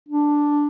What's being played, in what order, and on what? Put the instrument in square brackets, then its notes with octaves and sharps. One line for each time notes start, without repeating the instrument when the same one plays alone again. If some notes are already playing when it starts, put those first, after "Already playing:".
[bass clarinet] D4